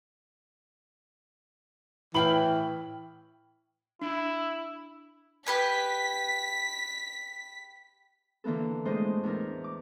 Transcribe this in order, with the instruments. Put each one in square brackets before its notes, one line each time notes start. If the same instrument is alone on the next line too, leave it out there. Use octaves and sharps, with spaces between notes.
[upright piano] A2 B5 F#7 [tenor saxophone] E3 [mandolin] F5 G5 F6
[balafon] D4 [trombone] E4
[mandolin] G4 B4 G#5 [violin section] B6
[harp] D3 E3 A#3 B3 A4
A2 G#3 D4 C5 D#5
E2 D4 A#4
D6